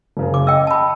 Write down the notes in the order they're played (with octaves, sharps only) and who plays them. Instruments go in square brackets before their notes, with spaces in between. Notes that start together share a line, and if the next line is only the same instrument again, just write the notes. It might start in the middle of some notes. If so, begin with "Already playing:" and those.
[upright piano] F#1 C#3
[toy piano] D6
[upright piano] D#5 [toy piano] G5 E6
[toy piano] A5 B5